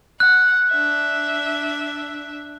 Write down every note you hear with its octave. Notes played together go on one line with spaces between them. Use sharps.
F#5 F#6
D4 E5